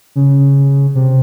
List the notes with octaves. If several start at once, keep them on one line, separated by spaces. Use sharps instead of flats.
C#3
C3